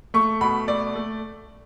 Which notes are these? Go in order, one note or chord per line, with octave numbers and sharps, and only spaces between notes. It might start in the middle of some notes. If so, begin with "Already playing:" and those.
A3 C#6
B2 B5
A3 D5
A3